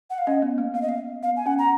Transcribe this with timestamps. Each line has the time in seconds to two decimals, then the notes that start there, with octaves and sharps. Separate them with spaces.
0.10 F#5
0.18 F5
0.27 C#4 D#5
0.42 B3
0.58 A#3
0.74 B3 F5
0.82 D#5
0.89 F5
1.23 B3 F5
1.37 G#5
1.46 C#4 F#5
1.59 A#5